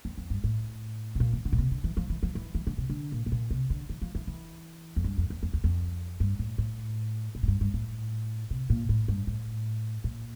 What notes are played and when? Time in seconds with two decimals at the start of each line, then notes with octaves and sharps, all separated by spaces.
0.05 F2
0.17 F2
0.30 G2
0.44 A2
1.15 C3
1.20 A#2
1.33 E3
1.45 D3
1.52 A#2
1.58 C3
1.71 D3
1.84 E3
1.97 F3
2.10 E3
2.23 F3
2.35 E3
2.55 E3
2.67 D3
2.78 C3
2.90 D3
3.12 A#2
3.26 A2
3.32 A#2
3.51 C3
3.70 D3
3.89 E3
4.02 F3
4.15 E3
4.27 E3
4.96 F2
5.04 G2
5.18 F2
5.30 E2
5.43 F2
5.53 E2
5.64 F2
6.20 G2
6.39 A2
6.58 A2
7.35 A#2
7.43 A2
7.48 G2
7.61 G2
7.74 A2
8.50 C3
8.70 A#2
8.89 A2
9.08 G2
9.27 A2
10.04 A#2